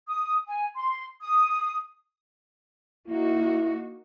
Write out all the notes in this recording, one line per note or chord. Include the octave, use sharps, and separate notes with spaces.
D#6
G#5
C6
D#6
A#3 D#4 E4 F#4